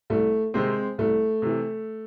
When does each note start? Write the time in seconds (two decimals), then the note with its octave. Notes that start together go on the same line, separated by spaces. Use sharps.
0.10 C2 A3
0.54 C3 D#3 G#3 C4
0.98 C2 A3
1.42 C3 E3